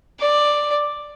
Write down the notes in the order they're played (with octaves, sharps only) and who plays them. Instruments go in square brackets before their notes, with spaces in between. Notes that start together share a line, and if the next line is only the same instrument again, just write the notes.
[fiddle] D5